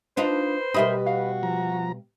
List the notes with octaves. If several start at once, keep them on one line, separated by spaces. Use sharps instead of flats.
D4 D#4 F4 B4 C5
B2 G3 A#4 D#5 E5 B5
F#4 F5
F3 A#5